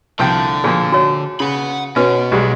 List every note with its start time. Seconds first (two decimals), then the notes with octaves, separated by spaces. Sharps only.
0.19 C2 D3 F3 G5
0.64 A#2 F3 G#4
0.92 F#4 C#5
1.40 C#3 F#5 B5
1.96 B2 C#4 F#4 B4
2.32 B1 G3 G#3